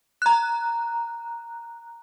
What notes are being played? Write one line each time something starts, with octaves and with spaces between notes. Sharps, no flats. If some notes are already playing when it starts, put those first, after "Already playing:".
A#5 F#6